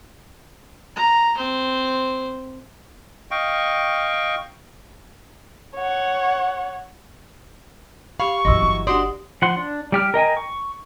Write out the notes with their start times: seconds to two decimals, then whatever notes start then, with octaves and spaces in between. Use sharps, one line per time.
0.96 A#5
1.36 C4 C5
3.31 D#5 F5 G5 C#6
5.75 C#5 F#5
8.20 G4 F5 B5 C#6
8.45 A#1 F#2 E3 F#3 D#5 C6 E6
8.62 G1
8.87 D4 F#4 G4 D5 F#5 C6 D#6
9.42 F3 F#5 C6
9.57 D4
9.92 G3 G4 F6
10.14 A#4 D#5 G5 G#5
10.37 C#6